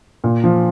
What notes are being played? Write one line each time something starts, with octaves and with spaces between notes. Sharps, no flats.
A#2
F3